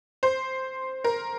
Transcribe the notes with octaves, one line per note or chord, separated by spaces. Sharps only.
C5
A#4